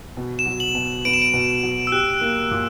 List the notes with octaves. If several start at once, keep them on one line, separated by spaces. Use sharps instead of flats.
B2
E7
F#3
F#7
B2
B3 D7
E7
D7
B2
F#3
E6
G4 F#6
A#3
A#2